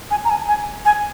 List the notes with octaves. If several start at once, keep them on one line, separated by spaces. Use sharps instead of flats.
G#5
A#5
G#5
G#5
G#5